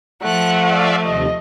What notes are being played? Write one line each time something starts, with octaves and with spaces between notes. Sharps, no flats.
F3 A3 F#5 F#6
D5 E5 F5
D#2 C3 D#5